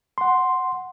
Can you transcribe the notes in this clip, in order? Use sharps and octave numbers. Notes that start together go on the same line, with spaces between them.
F#5 C6